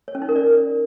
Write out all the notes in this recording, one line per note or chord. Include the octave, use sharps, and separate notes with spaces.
C#5
C#4
D#4
A#4
D5